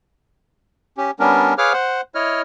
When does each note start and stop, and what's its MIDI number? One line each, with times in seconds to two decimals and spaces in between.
0.97 1.11 61
0.97 1.11 67
1.20 1.54 55
1.20 1.54 59
1.20 1.54 61
1.20 1.54 62
1.20 1.54 70
1.58 1.73 68
1.58 1.73 71
1.58 1.73 73
1.58 1.73 77
1.58 1.73 86
1.58 1.73 89
1.73 2.01 72
1.73 2.01 78
2.15 2.42 64
2.15 2.42 73
2.15 2.42 75
2.15 2.42 89